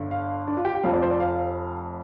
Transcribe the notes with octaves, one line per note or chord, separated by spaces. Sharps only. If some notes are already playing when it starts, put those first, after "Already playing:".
Already playing: G1 G2 D3
F5
D4
F4
G4
G5
F1 F2 F3 F5
D5
C5
D5
F5